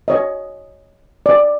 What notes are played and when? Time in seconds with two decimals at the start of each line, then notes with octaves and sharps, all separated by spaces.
0.08 C#5 D#5
1.26 D5